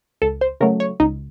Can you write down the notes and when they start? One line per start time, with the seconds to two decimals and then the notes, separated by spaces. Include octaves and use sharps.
0.22 C#2 A4
0.41 C5
0.61 C#3 F#3 A3 A#4
0.80 C#5
1.00 C#2 D#4